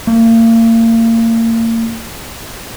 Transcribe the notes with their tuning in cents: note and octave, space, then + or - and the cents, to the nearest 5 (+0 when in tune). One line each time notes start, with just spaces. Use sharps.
A#3 -35